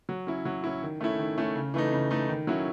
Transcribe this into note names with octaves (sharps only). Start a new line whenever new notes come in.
F#3
C#4 E4
F#3
C#4 E4
D#3
A3 C#4 E4
D#3
A3 C#4 E4
C#3
E3 A3 D#4
C#3
E3 A3 D#4
D#3
F#3 C#4 E4